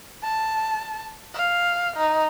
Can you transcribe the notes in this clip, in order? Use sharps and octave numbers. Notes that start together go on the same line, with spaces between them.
A5
F5
D#4